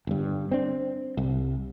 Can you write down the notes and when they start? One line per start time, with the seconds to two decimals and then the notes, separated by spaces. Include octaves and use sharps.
0.07 G1 G2
0.52 C4 D4
1.17 C2